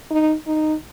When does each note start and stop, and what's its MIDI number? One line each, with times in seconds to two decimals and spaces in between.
0.11 0.33 63
0.47 0.74 63